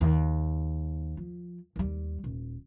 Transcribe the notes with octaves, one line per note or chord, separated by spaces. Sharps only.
D#2
F3
D#2 G3
D#1